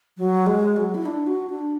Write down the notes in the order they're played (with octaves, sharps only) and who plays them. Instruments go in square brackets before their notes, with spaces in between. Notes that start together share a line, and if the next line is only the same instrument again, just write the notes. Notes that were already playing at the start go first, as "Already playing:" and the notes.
[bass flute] F#3
G#3
F#3
E4
D4
F#4
D4